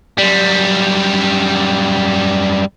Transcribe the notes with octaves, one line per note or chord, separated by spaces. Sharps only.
F#2 G3